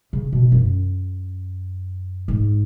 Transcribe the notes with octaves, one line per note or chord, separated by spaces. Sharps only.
C#3
B2
F#2
G#2